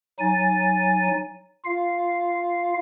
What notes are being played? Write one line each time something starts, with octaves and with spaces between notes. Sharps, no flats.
F#3 D#4 G#5 A6
F4 F5